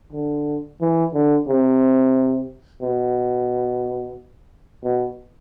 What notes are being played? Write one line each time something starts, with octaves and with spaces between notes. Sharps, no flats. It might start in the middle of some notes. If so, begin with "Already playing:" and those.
D3
E3
D3
C3
B2
B2